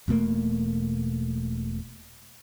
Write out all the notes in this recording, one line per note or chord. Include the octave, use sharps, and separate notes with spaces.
E1 B2 A3 A#3